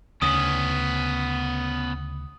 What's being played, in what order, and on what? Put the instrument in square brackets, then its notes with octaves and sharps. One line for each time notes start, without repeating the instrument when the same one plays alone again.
[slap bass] D2 C#3 [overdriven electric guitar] B3 C#4 [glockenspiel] D#6